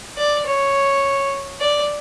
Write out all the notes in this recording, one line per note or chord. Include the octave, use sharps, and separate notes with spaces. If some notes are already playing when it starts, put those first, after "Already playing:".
D5
C#5
D5